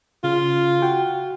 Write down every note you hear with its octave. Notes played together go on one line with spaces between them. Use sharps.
C#3 F4
F#4 F#5 G5